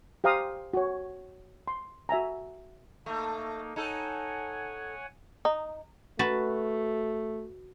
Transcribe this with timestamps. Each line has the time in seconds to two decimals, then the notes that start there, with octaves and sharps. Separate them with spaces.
0.24 G4 C5 F5 A#5 D#6
0.74 F#4 C#5
1.68 C6
2.09 F#4 E5 G#5 A#5
3.06 A3 A#3 D#4
3.76 D#4 A4 C#5 F#5 G#5
5.45 D#4
6.19 A3 F#4 B4 A5